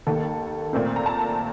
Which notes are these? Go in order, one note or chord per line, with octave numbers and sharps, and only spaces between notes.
D#2 D#3 A#3 A4
A#2 A3 C4 A#4
A#5
A5